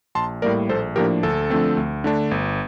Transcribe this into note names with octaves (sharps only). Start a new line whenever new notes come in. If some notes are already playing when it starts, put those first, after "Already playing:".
A#1 A5 C6
A2 G3 A#3 A#4 D5
A#1 A4 C5
A2 F3 A#3 D4 G4 A#4
D2 A4
D3 F3 A3 C4
D2
D3 A3 D4
G1